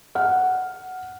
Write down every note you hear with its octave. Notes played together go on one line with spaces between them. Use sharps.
F#5 F6